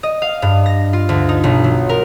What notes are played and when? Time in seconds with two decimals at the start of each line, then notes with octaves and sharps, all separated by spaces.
0.03 D#5
0.22 F5
0.42 G2
0.66 A#6
0.93 F4
1.09 D2
1.29 D#4
1.44 B1
1.64 F#3
1.89 A#4